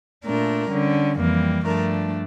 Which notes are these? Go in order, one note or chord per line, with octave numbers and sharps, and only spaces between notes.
A#2 A3 D4 A#4
D3 G3 C#4
F2 E3 G3 A#3
G2 F3 A3 D4 A#4